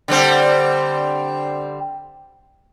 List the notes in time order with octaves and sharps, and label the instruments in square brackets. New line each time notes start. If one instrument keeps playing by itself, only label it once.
[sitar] D3 G3 C4